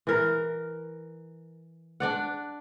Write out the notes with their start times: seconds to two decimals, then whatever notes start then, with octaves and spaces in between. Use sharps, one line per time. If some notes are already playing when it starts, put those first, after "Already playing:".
0.07 E3 A#4
2.00 D4 D5 F#5